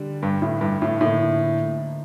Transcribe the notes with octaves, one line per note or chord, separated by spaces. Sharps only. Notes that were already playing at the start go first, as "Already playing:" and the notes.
Already playing: D3 G3 D4
G2
A2
G2
A2
A2 D3 F3 A#3 D#4